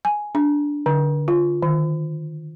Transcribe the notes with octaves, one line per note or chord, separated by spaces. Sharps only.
G#5
D4
D3
F4
D#3